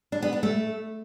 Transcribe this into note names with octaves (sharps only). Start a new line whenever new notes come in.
D4
B3
D4
A3